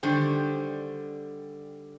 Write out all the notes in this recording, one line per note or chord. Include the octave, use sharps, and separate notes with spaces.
D3 D#3 G3 G4 C5